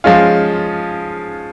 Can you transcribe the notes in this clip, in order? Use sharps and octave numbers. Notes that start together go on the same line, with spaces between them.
F3 G#3 C#4 F4